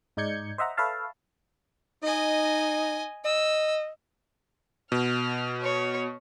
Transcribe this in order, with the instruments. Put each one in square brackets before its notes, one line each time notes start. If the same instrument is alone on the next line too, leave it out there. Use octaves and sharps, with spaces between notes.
[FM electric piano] G#2 D#4 D5 G6 G#6 C#7
C5 D#5 E5 F#5 A#5
A4 B4 C#5 E5 F5 A5
[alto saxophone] D#4 [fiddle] D#5 G#5
[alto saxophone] D#5 [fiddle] E6
[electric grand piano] B2 [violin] F6
[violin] C#5